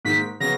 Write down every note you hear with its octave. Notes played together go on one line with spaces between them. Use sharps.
G#2 D#3 A#3 B6
C#3 F#3 B3 A#6